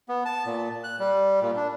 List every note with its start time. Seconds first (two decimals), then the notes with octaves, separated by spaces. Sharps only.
0.09 B3
0.25 A5
0.46 A#2
0.84 F#6
1.00 G3
1.42 A#2
1.57 D4